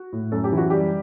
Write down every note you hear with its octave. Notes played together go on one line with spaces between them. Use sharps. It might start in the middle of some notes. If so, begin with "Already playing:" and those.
Already playing: F#4
A2
F#2 A4
G4
E3
F#4
G3 G4